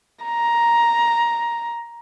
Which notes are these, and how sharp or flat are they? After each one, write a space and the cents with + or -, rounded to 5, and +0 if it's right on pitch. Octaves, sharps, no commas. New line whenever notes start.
A#5 +10